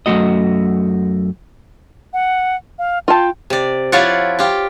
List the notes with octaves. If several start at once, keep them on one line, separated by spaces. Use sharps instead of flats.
F#2 D#3 A3 F#4 D#5
F#5
F5
F4 G5 A5
C3 D5
F3 E4 F4 C#5 D5 F#5
F4 G4